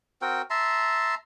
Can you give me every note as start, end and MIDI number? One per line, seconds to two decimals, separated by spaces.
0.22 0.42 60
0.22 0.42 66
0.22 0.42 70
0.22 0.42 79
0.50 1.15 76
0.50 1.15 81
0.50 1.15 82
0.50 1.15 84